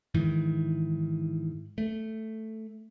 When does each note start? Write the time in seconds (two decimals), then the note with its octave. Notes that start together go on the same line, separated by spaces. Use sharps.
0.14 G#2 D#3 E3
1.78 A3